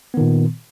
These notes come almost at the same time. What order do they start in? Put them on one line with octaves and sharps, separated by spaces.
B3 D#3 A#2